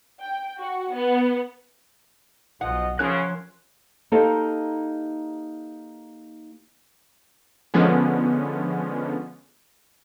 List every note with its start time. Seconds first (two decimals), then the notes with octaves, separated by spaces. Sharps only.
0.19 G5
0.60 F#4
0.95 B3
2.61 B1 F3 F4 D#5 F#5
2.99 C#3 F3 C#4 A#4 C#5 C6 F#6
4.12 A#3 D#4 G4 A4 C5 D#5
7.74 D3 F3 G#3 B3 C#4